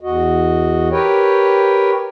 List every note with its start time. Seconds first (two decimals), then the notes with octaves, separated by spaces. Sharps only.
0.01 E2 F#4 D#5
0.91 G4 A#4 B4 C#5 G5